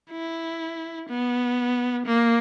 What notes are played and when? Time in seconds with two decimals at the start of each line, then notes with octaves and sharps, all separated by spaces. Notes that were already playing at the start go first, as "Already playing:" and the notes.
0.11 E4
1.09 B3
2.06 A#3